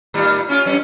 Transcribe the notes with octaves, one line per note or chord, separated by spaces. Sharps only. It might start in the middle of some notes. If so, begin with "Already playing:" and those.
A2 D#3 G3
C#4 F4
F#2 C#4